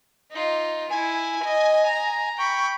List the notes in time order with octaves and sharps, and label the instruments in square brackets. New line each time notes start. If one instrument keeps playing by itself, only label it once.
[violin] D#4 F4
[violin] E4 [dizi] G#5
[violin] D#5
A#5
[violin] G5 B5 [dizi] C#6